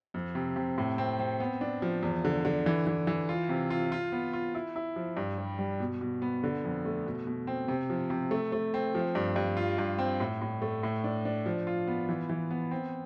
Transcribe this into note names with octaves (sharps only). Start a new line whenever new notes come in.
F2
C3
C3
A2
C4
C4
B3
D4
F3
E2
D3
D3
E3
E3
E3
F4
C3
F4
F4
B3
F4
E4
E4
F3
G2
G3
G3
B2
B2
B3
D3
F2
A3
B2
B2
C4
C3
F3
C3
A3
A3
C4
F3
G2
G2
F4
G2
C4
A2
A2
A3
A2
D4
D4
F3
F4
B3
E3
E3
B3
C4